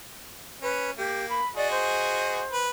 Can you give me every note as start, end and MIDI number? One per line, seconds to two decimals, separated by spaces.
0.62 0.91 61
0.62 0.90 71
0.98 1.40 58
0.98 1.27 67
1.29 1.45 83
1.56 2.42 66
1.56 2.42 68
1.56 1.70 74
1.56 2.42 75
1.70 2.57 72
2.52 2.70 71